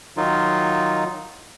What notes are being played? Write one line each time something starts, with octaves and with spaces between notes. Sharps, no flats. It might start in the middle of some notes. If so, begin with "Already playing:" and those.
D#3 F#3 D#4 F4